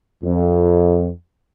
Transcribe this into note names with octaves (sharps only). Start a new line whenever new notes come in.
F2